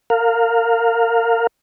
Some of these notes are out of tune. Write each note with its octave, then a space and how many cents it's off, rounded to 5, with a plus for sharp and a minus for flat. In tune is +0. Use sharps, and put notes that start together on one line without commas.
A#4 -25 F5 +10